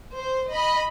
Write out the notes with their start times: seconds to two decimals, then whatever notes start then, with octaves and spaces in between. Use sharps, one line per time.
0.15 C5
0.52 D#5 B5